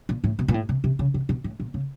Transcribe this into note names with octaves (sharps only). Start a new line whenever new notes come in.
A#2
A2
B2
A#2
A2
C3
C3
C#3
C3
B2
A2
A#2
C#3